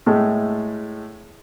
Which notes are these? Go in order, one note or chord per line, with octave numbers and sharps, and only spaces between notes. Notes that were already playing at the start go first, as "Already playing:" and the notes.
A2 G#3 A3